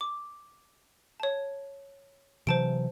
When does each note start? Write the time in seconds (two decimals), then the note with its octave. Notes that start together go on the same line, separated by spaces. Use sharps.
0.01 D6
1.20 C#5 A5
2.47 C3 E3 F#3 C5 A5 D7